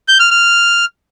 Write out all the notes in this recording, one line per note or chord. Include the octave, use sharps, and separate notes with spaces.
G6
F6
F6